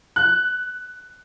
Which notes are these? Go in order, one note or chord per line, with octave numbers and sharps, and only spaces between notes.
F#6